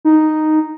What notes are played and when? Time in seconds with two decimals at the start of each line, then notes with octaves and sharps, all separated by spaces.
0.05 D#4